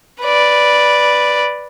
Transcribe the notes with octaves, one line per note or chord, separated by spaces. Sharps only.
B4 D5